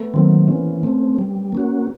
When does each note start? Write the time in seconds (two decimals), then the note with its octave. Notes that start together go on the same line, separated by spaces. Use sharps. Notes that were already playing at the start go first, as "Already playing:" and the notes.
Already playing: A3 B3
0.14 D#3 F#3 A#3 C4
0.48 E3 B3 C#4
0.83 A3 C4
1.19 G3
1.52 A#3 C#4 F#4